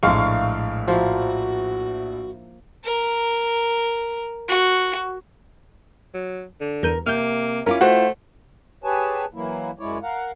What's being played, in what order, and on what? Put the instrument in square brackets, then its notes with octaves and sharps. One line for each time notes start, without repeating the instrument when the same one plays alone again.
[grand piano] A#1 A2 [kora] G#3 A#3 [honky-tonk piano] F5 C#6
[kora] F3 A#3 E4 [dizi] F#4
[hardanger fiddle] A#4
F#4
[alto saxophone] F#3
D3
[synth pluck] E2 G6 D#7 [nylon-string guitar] A#4
[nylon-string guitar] C3 [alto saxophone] A#3 [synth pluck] F6 G6
[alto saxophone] C#4 [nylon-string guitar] E4 F4 [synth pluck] A#4 D6
[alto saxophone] A3 [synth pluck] F#4 [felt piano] C5 F#5
[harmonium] G4 G#4 B4 C#5 G#5 A5
E3 F#3 A#3 E4
F#2 G#3 E4 C#5 D5
A#4 F5 F#5